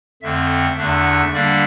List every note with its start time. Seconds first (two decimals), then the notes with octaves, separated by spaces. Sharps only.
0.22 F2 D3 A3 C4 E5
0.78 E2 D3 A3 D4 E5
1.33 D3 G3 A#3 D4 D5